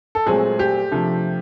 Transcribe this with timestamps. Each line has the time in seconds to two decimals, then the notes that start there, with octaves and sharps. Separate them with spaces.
0.15 A4
0.26 A#2 F#3 G#3 A3 C4 G#4
0.59 G4
0.91 C3 F3 A3 D4